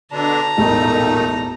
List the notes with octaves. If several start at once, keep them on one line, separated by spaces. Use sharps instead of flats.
B2 D3 D4 A5 A#5
E1 A1 A#2 A3 D#4